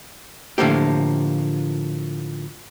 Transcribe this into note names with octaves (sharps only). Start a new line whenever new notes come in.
A2 D3 F3 A#3 G4